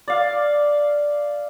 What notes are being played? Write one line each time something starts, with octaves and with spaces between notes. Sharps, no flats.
D5 F5